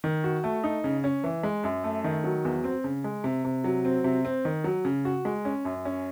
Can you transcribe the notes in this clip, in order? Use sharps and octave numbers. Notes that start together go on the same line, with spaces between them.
D#3
F#4
A3
D#4
C#3
C#4
E3
G#3
F#2
A3
D#3
F#3
E2
C4
C#3
G#3
C3
C3
F#3
C4
C3
C4
D#3
F#3
C#3
F#4
G#3
C#4
F#2
C#4